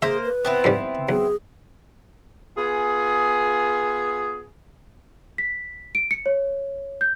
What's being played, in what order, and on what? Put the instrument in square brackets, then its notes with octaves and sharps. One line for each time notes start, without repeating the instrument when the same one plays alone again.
[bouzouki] A#3 C5 [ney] G#4 [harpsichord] E5
[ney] B4
[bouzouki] B3 C4 E4
[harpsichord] F2 G#2 G3
[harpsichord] B1 [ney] G#4
[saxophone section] B3 F4 G#4
[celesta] B6
D7
C#7
C#5
G6